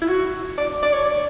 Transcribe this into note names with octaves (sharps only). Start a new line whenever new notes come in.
E4
F#4
D5
D5
C#5
D5